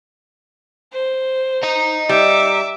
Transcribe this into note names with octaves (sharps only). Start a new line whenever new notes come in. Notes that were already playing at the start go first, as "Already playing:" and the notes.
C5
D#5 A#5
G3 E5 D6